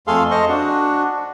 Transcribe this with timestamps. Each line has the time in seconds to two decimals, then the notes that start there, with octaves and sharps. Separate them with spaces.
0.07 F2 A3 G#4 A4 F5 C6
0.31 C5 D#5 C#6
0.48 D4 F#4